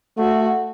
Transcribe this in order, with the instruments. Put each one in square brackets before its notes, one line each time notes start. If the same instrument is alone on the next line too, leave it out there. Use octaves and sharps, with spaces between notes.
[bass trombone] A3 [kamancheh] F#4